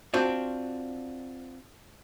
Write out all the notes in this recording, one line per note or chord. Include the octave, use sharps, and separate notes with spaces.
C4 D4 F4 F#4